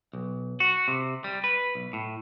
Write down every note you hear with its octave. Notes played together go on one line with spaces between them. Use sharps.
B1
F#4
C3
G3
B4
B1
A2